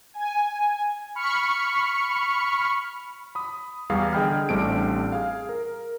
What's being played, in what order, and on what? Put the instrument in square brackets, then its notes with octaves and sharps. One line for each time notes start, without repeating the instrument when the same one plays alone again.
[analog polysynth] G#5
B5 C#6 F6 C#7
[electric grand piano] B5 D#6
E2 G3 G#4 F5 C7
D3 G#4 D#5 G5 B5 F6
A1 G3 A3 C4 D4 D7
G#4 F5
A#4